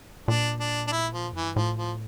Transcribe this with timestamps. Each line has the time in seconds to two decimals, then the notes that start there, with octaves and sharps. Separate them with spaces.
0.28 A#2 D4
0.60 D4
0.87 D4
0.92 E4
1.13 F3
1.33 F2 E3
1.44 G2
1.55 A2 F3
1.77 F3